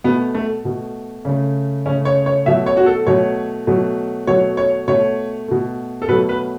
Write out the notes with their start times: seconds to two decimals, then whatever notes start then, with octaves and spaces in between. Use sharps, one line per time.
0.04 B2 A3 B3
0.35 A3
0.65 B2 A3
1.25 C#3 A3
1.86 C#3 A3 C#4
2.05 C#5
2.26 C#5
2.46 B2 F#3 A3 E5
2.66 C#5
2.77 F#4
2.86 A4
3.07 B2 F#3 A3 C#5
3.67 B2 F#3 A3
4.27 B2 F#3 A3 C#5
4.57 C#5
4.88 B2 A3 C#5
5.48 B2 A3
6.02 A4
6.08 B2 F#3 A3 B4
6.29 B4